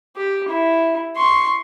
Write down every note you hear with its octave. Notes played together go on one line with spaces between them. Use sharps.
G4
E4
C6 C#6